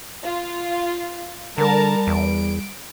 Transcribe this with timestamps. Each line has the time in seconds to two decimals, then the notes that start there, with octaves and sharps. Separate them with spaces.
0.24 F4
1.58 D3 G3 A#4 A5 A#5
2.07 E2 D7